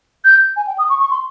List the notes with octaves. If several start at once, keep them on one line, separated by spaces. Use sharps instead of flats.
G6
G#5
G5
D#6
C#6
C#6
C6